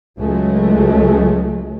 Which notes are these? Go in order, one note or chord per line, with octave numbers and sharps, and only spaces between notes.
C#2 F#3 G#3 A3